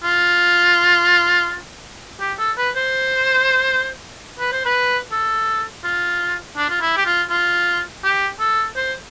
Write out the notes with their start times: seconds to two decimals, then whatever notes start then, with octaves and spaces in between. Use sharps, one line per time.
0.03 F4
2.21 G4
2.39 A4
2.58 B4
2.76 C5
4.40 B4
4.52 C5
4.65 B4
5.12 A4
5.84 F4
6.57 D4
6.70 F4
6.81 E4
6.97 G4
7.05 F4
7.30 F4
8.03 G4
8.40 A4
8.76 C5